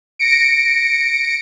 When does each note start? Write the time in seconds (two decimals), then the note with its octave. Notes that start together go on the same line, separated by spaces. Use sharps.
0.19 A#6 C#7 D7